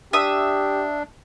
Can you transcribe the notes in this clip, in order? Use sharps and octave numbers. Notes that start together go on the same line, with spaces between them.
D4 G4 E5 D#6